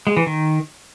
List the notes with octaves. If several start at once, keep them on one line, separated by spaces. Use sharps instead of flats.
G#3
E3
D#3